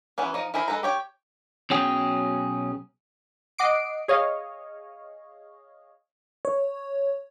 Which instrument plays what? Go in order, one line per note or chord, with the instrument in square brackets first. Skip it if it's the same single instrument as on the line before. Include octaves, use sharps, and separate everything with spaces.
[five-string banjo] E3 F#3 B3 C#4
F3 D#4 D#5
E4 G#4 A#4 C5 B5
G#3 A4 B4 A#5
G4 C#5 G5
[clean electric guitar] B1 B2 F#3 C#4 G#4 G5
[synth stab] D#5 F#5 D6 C7 D7
G#4 C#5 D#5 F5
[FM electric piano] C#5